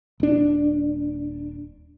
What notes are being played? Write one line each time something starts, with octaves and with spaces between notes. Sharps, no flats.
D#1 D4